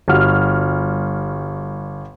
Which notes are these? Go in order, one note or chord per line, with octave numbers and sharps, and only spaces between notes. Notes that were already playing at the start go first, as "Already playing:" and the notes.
G1 G3 F#4 F6